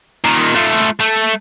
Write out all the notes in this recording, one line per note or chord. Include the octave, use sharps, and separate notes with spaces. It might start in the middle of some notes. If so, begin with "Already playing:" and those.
A#2 D#3
A3 F4
A3